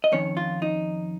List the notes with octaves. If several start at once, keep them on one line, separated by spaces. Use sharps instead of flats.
D#5
F2 D#3 C#4 C#5
F4
D#4